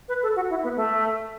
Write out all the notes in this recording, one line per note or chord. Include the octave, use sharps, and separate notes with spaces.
B4
A4
F#4
E4
B3
A3